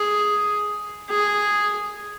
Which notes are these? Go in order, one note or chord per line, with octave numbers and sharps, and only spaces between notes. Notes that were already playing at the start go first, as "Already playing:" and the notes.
Already playing: G#4
G#4